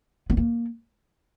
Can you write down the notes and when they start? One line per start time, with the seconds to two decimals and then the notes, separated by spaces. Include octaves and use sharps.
0.30 B3
0.37 A#3